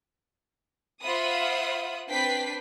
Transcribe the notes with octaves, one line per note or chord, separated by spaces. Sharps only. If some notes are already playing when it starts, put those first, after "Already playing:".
F4 C5 E5 F#5 B5 D#6
C4 D4 B4 G5 B6 C7